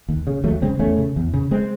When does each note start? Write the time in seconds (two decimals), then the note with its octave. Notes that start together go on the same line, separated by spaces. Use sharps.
0.09 D#2
0.27 C#3
0.44 D#2 F#3 A3
0.62 C#3 G#3 C4
0.79 E2 A3 C#4
0.98 C#3
1.16 E2
1.34 C#3
1.51 G#3 C4